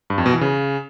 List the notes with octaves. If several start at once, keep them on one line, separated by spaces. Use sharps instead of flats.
G2
F2
B2
E3
C#3